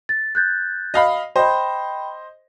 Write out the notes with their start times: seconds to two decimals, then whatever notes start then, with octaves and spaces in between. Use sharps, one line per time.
0.09 A6
0.35 F#6 G6 A6
0.94 D#5 F5 B5
1.36 C5 D#5 G5 B5